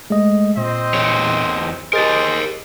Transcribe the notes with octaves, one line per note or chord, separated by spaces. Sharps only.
G#3 A3 D#5
A#2 C4 C5 D#5
E2 G#4 C#5
G4 G#4 A#4 C5 D#5 A6